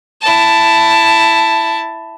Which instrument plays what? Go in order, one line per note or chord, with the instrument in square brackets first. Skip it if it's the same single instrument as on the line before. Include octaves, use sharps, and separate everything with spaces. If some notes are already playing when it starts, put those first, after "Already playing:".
[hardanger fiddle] E4 A5